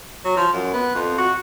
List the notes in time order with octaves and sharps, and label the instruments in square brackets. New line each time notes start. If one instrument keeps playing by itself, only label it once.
[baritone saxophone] F#3
F3
F#2
B3
F2
F#4